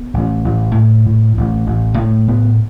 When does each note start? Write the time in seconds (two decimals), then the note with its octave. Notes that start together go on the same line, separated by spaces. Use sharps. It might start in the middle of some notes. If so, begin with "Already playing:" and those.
Already playing: B3
0.14 A1
0.44 A1
0.75 A2
1.06 A2
1.37 A1
1.66 A1
1.98 A2
2.28 A2 B3